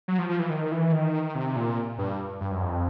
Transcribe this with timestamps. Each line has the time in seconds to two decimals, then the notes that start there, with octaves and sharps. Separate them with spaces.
0.08 F#3
0.19 F3
0.29 F3
0.39 E3
0.50 D#3
0.72 E3
0.92 D#3
1.35 C3
1.56 A#2
1.98 G2
2.41 G2
2.51 F#2
2.62 F2